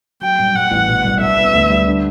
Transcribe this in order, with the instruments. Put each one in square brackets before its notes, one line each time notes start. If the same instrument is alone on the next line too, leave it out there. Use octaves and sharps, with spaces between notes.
[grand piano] F#3 [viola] G5
[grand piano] G2
[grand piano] G2 [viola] F#5
[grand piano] A1
B2
C2
[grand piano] G2 [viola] E5
[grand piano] B3
D2
G3
D3